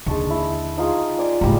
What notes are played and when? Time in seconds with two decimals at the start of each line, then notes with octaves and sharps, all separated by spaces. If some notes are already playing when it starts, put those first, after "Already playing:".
0.06 D#2 D3 G#3 A5 C#6
0.30 E4
0.78 D#4 F4 G#4
1.19 D5 G#5
1.41 F#1 G#2 G3 G4 A#5